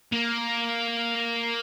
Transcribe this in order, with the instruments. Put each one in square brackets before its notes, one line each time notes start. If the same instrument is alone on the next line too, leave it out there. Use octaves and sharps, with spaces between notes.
[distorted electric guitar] A#3